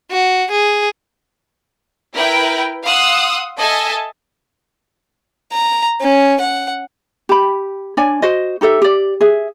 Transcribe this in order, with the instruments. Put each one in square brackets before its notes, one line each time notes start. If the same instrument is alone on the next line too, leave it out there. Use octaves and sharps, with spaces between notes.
[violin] F#4
G#4
[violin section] E4 A#4 B4 G5
F5 F#5 C6 D#6 E6 F#6
A4 D#5 E5 G#5 A5
[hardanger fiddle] A#5
C#4
F#5
[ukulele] G4 B5
D4 C#5 D5 G#5
F#4 C5 D#5
D#4 G4 A4 E5
G4 D5
G#4 E5